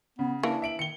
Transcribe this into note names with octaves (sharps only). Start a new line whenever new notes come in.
C#3 B3
E3 A#3 D4
E5 D7 F#7
D#3 C#7 G7